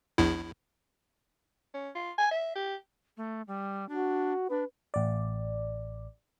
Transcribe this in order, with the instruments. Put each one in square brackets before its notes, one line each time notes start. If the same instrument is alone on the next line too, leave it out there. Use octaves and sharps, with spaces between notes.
[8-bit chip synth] A#1 E2 E4
[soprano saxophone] C#4
F4
G#5
E5
G4
[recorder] A3
G3
[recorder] D4 [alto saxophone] F#4
[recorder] D4 [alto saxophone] B4
[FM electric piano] A1 D5